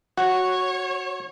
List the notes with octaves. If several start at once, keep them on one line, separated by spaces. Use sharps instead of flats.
F#4 C#5